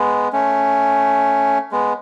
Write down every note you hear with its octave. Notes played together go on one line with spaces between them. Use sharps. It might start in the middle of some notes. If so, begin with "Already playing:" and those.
Already playing: G#3 B3
A3 C#4
G#3 B3